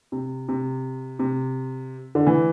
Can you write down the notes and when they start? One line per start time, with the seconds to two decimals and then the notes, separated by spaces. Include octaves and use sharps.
0.12 C3
0.49 C3
1.19 C3
2.15 D3
2.27 E3